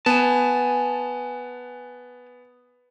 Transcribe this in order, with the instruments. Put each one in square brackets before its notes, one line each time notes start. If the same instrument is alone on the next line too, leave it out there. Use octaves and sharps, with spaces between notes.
[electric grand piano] B3 [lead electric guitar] G#5 A5